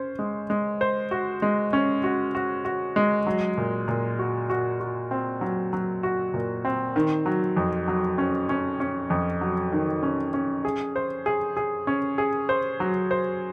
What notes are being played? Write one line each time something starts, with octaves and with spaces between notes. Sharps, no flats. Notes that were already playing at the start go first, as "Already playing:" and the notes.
Already playing: C#4 C5
G#3
G#3
C5
F#4
G#3
C#4
F#4
F#4
F#4
G#3
F#3
A#2
A#2
F#4
F#4
F#4
C4
F#3
F#3
F#4
A#2
C4
D#3
F#3
F2
F#3
C#4
C#4
C#4
F2
F#3
D#3
C#4
C#4
G#4
C5
G#4
G#4
C#4
G#4
C5
F#3
C5